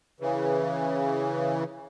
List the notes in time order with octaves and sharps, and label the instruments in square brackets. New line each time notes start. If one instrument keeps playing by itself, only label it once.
[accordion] C#3 E3